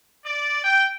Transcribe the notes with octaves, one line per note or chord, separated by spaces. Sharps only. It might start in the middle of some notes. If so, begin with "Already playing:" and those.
D5
G5